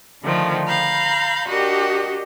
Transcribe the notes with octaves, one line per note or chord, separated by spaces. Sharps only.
D3 D#3 F3 A3
F5 A#5 B5 G6
D4 F#4 G4 A#4 D#5